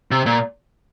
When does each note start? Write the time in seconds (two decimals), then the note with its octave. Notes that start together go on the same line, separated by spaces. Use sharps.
0.11 C3
0.26 A#2